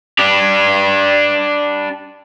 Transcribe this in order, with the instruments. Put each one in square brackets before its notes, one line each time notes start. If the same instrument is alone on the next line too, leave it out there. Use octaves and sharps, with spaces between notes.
[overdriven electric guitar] D4 G4